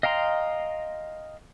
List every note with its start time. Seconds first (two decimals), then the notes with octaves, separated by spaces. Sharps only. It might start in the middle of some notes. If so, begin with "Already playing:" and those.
0.03 D#5 F5 G5 A#5 C6